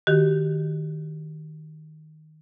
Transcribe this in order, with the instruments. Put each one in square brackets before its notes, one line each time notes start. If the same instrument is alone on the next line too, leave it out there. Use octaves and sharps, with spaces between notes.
[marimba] D#3 F#4 G4